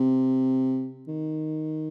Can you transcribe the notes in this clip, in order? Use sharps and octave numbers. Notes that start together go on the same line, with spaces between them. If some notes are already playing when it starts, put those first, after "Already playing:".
Already playing: C3
D#3